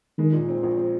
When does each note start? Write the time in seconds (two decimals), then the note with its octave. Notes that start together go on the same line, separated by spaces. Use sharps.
0.18 D#3 G#3
0.33 A#2
0.49 C4
0.63 A#1
0.78 C4